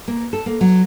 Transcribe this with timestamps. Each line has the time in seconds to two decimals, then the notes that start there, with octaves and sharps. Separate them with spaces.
0.08 A#3
0.33 A4
0.46 A#3
0.61 F#3